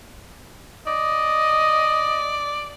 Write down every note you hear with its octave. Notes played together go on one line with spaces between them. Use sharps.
D5 D#5